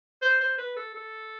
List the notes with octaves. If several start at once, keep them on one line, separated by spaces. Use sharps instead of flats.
C5
C5
B4
A4
A4